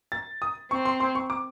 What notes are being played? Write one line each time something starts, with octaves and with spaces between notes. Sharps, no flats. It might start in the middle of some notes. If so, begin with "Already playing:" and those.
A6
D#6
C4 C#6
C6
C6
C#6
D6